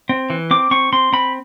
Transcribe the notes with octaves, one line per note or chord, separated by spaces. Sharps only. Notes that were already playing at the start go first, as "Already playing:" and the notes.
C4
E3
C4 D6
C4 C#6
C4 C6
C4 B5